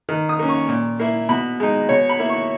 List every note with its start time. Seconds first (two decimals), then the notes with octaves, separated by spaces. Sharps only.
0.09 D#3
0.29 D#6
0.39 A#3 C#4
0.49 C#6
0.69 A#2
1.00 A#3 E4
1.29 B2 B5
1.60 G#3 D#4
1.89 B2 C#5
2.09 B5
2.19 A#3 E4
2.30 C#6